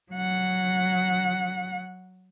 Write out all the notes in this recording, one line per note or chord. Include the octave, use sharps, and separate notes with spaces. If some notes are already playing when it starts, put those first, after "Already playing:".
F#3 F#5